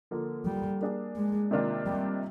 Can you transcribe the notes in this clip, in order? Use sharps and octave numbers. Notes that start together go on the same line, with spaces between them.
D3 F3 A#3
G3
A#3 D4 G#4
G#3
C3 D#3 A#3 D4 F4
G3